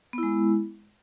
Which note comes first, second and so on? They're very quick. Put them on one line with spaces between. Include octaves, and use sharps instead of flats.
B3 E4 G#3